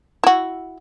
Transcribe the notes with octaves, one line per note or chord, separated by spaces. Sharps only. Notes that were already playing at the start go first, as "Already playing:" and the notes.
E4 F#4